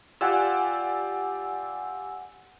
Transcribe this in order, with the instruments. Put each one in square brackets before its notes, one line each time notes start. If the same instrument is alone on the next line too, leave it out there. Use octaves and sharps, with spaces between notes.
[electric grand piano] F4 G4 D5 [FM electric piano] F#5 G#5 E6